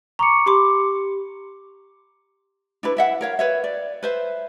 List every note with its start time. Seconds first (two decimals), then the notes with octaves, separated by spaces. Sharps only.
0.19 A#5 C#6 D6 C#7
0.46 G4 B5 C6 D6
2.83 D4 E4 B4
2.97 E4 E5 F#5
3.21 A#4 C#5 F5
3.39 B4 C#5 E5
3.64 D5
4.03 B4 C5 E5